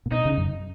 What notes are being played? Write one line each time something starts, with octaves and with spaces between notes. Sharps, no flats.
A#2
B2 D#4
C#3
F#2